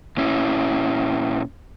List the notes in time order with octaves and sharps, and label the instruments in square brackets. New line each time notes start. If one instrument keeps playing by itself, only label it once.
[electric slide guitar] A#2 C#4 E4